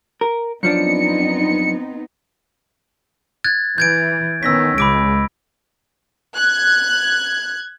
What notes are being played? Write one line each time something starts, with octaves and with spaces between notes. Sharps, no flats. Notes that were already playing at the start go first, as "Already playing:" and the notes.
A#4
F#2 F3 B3 C4 D4 D#4 C#7
F#6 G#6 A6
E3 G6 G#6 D7
D#3 B3 C#4 E6 A#6 B6
C#2 G#3 B5 D6 D7
F#6 G#6